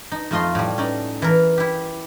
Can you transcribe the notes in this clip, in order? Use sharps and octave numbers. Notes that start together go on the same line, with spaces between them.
D#4
F2 A3 F4 D#5 C6
A2 G3
C#4 D#4 D5
E3 A#4
E4 G4